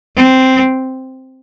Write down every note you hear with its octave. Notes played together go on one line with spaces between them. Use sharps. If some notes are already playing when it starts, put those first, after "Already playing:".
C4